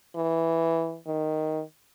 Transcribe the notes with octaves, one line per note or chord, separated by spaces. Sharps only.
E3
D#3